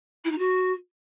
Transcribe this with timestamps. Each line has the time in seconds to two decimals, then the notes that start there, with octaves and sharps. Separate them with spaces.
0.24 E4
0.31 D#4
0.38 F#4